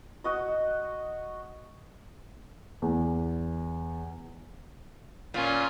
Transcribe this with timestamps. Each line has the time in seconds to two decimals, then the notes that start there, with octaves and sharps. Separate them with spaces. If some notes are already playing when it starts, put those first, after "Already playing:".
0.24 F#4 D#5
2.82 E2
5.34 A#2 C#4 F4